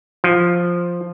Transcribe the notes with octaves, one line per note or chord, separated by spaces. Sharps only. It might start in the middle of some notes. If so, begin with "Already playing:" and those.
F3